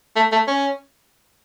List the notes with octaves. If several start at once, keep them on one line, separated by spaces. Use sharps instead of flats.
A3
A3
C#4